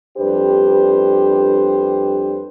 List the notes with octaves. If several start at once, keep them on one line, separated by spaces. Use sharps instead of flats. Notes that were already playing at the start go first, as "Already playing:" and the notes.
F2 G3 D4 G4 B4 C5